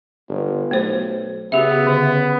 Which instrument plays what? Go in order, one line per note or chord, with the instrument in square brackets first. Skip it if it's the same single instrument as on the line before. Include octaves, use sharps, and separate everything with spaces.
[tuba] G1
[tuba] B1 [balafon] A3 C5
[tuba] C#3 [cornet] B3 [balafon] F#4 G4 E5
[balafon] D3